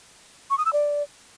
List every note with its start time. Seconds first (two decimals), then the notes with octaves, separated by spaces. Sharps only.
0.50 C#6
0.58 D#6
0.65 E6
0.73 D5